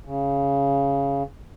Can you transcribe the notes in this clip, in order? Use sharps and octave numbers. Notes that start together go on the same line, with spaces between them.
C#3